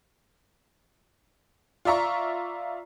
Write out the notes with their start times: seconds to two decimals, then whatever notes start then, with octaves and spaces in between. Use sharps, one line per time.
1.85 F4 D5 E5 A#5 C#6